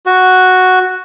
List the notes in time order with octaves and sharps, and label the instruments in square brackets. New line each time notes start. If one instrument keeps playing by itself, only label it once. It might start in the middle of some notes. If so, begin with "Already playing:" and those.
[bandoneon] F#4